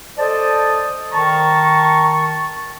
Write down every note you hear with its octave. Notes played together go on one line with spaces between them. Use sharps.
A4 C5 D5 D#5 A5
D#3 A5 A#5 C#6